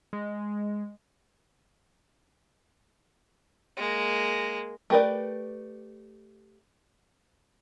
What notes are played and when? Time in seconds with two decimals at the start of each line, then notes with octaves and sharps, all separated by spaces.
0.13 G#3
3.77 G#3 A#3
4.90 A3 G4 A#4 B4 D5